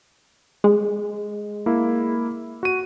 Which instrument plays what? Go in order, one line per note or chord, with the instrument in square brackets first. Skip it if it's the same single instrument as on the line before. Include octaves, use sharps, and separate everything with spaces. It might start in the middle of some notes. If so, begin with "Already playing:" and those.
[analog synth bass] G#3
[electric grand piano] A#3 E4
F#4 D#7